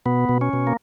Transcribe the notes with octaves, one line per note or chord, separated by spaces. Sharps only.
B2 B3
B2
C#4
B2
A#3